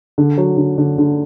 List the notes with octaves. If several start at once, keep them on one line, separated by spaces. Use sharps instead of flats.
D3
F#3
D3
D3
D3